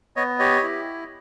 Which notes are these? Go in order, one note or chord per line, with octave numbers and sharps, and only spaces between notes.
B3 C#5 D#5
G4 C#5 D#5
E4